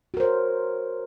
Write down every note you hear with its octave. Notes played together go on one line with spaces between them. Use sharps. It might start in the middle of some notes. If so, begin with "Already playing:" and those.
F#4 A#4 C5 C#5